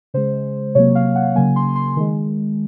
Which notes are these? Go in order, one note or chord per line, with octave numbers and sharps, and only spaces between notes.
C#3 G#3 C5
C3 F#3 A#3 C#5
F5
F#5
C#3 F#3 A#3 G#5
C6
C6
D#3 G#3